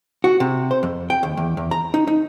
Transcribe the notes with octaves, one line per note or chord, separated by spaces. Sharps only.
F#4
C3
C5
F2
G5
D#2
E2
E2
A#5
D#4
D#4